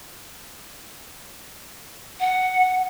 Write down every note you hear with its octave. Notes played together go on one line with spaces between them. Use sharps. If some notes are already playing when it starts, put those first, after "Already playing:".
F#5